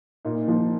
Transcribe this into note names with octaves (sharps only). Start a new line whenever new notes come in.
A#2 D#4
F3